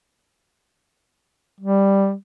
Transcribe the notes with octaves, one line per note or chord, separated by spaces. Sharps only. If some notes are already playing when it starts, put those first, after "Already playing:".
G3